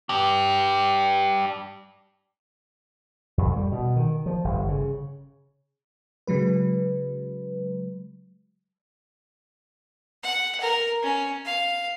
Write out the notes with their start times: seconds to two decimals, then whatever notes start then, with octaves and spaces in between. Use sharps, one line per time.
0.09 D4 G4
3.38 F2
3.56 G3
3.72 B2
3.96 D#3
4.26 F3
4.44 G1
4.68 C#3
6.27 C#3 F#3 G#3 B4
10.23 F#5
10.61 A#4
11.03 C#4
11.45 F5